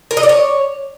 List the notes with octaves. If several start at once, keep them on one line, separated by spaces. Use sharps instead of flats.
A#4
D#5
D5
C#5